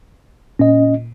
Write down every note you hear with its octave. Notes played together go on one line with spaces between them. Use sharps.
A#2 C#4 D#5